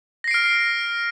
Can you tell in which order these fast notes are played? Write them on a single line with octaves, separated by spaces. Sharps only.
A#6 C7 D7 F6